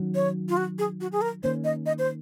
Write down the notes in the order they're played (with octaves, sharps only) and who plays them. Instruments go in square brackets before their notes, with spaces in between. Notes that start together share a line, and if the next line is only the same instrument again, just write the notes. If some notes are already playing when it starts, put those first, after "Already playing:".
Already playing: [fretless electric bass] D#3 F#3 C#4
[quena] C#5
F4
F#4
G#4
F#4
G#4
A#4
[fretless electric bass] D#3 A#3 C#4 [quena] C5
[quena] D#5
D#5
C5